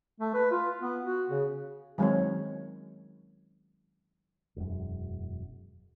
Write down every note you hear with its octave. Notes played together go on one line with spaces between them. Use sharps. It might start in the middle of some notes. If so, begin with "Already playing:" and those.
A3
B4
F4
B3
F#4
C#3
D#3 F#3 G#3 C4 C#5
E1 F#2